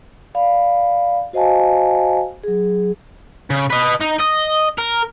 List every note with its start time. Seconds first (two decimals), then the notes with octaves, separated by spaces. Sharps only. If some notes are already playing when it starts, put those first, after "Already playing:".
0.35 D5 F5 B5
1.33 F#4 C5 D#5 F5 G#5 A5
2.44 F#3 G#4
3.50 C#3
3.70 B4 D#5
4.00 D#4
4.19 D#5
4.78 A#4